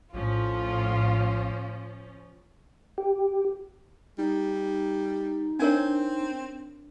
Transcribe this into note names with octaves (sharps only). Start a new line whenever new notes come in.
A#1 A2 F3 C#4 F4
G4
G3 D#4
C4 D4 A#4 C#5